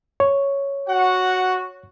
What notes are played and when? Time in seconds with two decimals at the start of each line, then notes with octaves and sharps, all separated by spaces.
0.20 C#5
0.88 F#4 F#5